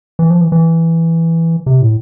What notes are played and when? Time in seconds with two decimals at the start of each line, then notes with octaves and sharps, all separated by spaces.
0.19 E3
0.30 F3
0.41 E3
0.52 E3
1.66 C3
1.81 A2